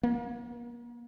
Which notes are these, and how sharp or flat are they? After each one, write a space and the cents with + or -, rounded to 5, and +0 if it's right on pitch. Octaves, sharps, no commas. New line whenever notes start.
A#3 +35